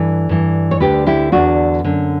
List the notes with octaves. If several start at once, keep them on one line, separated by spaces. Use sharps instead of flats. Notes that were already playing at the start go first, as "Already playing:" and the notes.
Already playing: G2 E3 A4
G2 E3
C#5
D2 D3 G4 B4
E4 G4
E2 D3 D4 F#4
F#2 D3